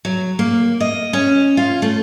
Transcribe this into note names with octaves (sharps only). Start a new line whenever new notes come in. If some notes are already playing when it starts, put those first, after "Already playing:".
F#3
A#3
D#5
C#4
F4
A3